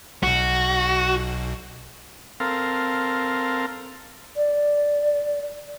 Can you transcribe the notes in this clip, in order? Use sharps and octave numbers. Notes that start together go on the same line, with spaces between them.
B1 B2 F#4
C4 A4 A#4 F5
D5